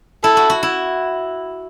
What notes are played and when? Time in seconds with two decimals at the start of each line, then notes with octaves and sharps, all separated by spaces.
0.24 E4 A4
0.37 F#4
0.50 F#4
0.63 E4